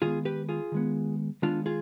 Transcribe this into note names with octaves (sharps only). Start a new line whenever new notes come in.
D#3 G#3 B3 F4 G#4
G4 B4
F4 G#4
D#3 G#3 B3
D#3 G#3 B3 D4 F4
F4 G#4